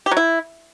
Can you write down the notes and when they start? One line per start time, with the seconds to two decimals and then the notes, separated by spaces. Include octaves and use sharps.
0.06 G4
0.11 F#3
0.17 E4